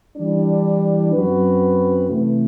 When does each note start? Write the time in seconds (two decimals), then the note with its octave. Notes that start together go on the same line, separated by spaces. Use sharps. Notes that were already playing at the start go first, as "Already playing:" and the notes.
0.16 E3 G3 D4
1.13 F#2 F#3 C4 F#4 B4
2.09 C3 E3 A3